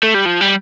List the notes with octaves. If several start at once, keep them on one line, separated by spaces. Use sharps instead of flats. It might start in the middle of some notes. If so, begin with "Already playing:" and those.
A3
G3
F3
G3